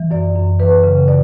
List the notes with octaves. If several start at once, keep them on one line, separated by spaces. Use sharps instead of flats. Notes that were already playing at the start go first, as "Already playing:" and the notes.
Already playing: E3
F#2 D5
F#2
E3 B4
C#3
D5